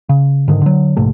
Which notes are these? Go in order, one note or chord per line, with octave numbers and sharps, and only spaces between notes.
C#3
G#2 D3 D#3
D3 F#3
A#1 G#2 C3 A3